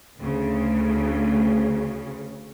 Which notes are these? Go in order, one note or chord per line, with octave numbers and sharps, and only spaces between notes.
D2 C#3